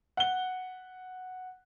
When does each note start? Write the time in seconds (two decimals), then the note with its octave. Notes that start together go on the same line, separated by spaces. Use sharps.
0.17 F#5 G7